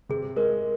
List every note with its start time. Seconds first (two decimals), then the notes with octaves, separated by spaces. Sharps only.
0.09 C3 G#4
0.36 G#3 A#4